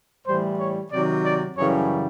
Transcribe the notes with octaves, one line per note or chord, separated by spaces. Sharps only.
A2 E3 G3 C5
C#5
C3 D#3 F#3 D5
D5
F#2 C#3 E3 G3 C#5